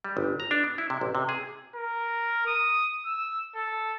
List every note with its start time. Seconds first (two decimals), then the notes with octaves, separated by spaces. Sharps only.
0.04 G3
0.17 G1
0.40 A#5
0.51 D4
0.64 B3
0.78 E4
0.90 C3
1.01 A1
1.15 C3
1.29 G#4
1.75 A#4
2.46 D#6
3.05 E6
3.55 A4